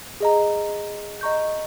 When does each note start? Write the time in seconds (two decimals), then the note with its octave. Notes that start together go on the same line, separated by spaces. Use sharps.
0.20 G#4 D#5 A#5
1.21 D#5 A#5 C#6 G6